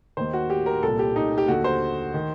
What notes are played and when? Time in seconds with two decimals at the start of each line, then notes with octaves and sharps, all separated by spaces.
0.17 D#2 D#3 C5
0.33 F#4
0.50 G4
0.66 A#4
0.83 C2 A#2 A4
0.99 G4
1.16 D#4
1.38 G4
1.48 D#2 D3 F#4
1.64 C5
2.14 D#3